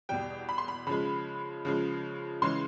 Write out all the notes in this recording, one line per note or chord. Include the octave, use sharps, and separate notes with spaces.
E2 B2 G3 G5
B5
C6
B5
C#3 F3 G#3 B5
C#3 F3 G#3
C#3 E3 G#3 C6